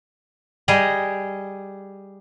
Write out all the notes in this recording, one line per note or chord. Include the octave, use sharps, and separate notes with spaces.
G3 G#4 D#5